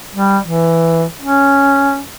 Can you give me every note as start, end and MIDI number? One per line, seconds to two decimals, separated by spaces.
0.14 0.38 55
0.45 1.04 52
1.22 1.99 61